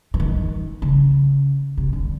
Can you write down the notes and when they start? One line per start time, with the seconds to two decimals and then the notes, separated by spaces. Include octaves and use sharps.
0.14 E3
0.20 D#3
0.82 C#3
1.77 C3
1.93 D3